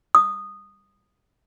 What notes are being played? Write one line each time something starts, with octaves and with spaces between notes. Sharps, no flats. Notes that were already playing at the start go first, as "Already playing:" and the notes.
D#6